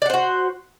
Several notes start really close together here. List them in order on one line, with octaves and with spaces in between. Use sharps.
D5 F#5 C5 F#4